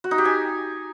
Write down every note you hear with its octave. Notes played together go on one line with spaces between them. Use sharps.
F#4
D#4
G4
G#5